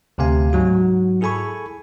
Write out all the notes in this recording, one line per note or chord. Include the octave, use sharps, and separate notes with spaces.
D2 C3 A3 F5 G#5
G#2 F#3 F#4
E4 G#4 A4 G#5 B5 C#6